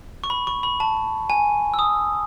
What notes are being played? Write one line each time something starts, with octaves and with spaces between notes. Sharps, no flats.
C#6
B5
C#6
B5
A5
G#5
E6
D#6